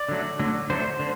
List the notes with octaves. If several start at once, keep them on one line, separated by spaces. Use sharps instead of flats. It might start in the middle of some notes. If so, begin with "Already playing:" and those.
Already playing: D5
D3 F#3 A3
D3 F#3 A3
D3 F#3 A3 C5
D3